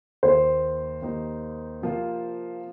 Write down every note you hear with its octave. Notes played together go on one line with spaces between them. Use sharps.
D#2 D#3 A#3 C5
D#2 D#3 A#3 D#4
C3 F3 A#3 F4